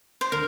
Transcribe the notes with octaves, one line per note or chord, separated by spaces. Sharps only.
C5
D3 A#4